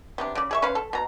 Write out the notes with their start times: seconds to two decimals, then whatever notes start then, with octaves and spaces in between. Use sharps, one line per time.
0.18 C3 B3 D4
0.35 C#3 D5
0.51 G#4 E5 C#6
0.62 C#4 B4 C5 F5
0.75 A4
0.93 B2 A#5